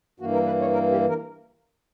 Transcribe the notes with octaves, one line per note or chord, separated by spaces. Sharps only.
G2 E3 A#3 F#4
A#4
B4
C#5
A#4
G4
A#4